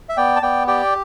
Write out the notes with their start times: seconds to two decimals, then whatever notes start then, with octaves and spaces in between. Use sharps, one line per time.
0.09 E5
0.17 B3 D5 G5
0.36 A5
0.42 B3 D5 G5
0.67 G4 D5 G5